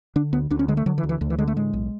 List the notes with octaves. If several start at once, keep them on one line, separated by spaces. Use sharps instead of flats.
D3 D4
D2 B3
D2 D4
C#4
D3 G#3
A3
D3 F#3
E3
D2
E3
D2 D3
E3
D3 G#3
A3
A2 G#3
B1